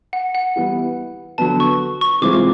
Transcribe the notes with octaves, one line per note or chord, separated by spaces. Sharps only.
F#5
F#5
E3 G3 B3 E4
D3 F#3 B3 A5
C#6
C#6
C3 E3 G#3 C4 F4 D6